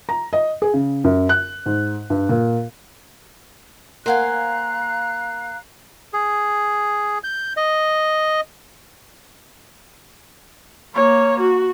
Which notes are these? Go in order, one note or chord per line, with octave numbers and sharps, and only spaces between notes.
A#5
D#5
G#4
C#3
F#2
F#6
G#2
G2
A#2
A#3 C5 F5 F#5 G#5 A#5 F#6
G#4
G6
D#5
A#3 C#5
F#4